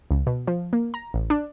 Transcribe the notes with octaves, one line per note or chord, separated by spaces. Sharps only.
C#2
B2
F3
A#3
A#5
A1
D4